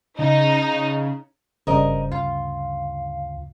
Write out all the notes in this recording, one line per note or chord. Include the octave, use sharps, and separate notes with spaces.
C#3 D#4
F#1 G2 C#3 A#4 C5 D#5
D2 F4 F5